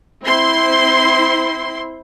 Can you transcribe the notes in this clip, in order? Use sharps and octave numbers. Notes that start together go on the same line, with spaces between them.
C4 E4 C6